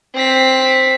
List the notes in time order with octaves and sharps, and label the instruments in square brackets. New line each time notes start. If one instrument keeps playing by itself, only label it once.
[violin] C4 B6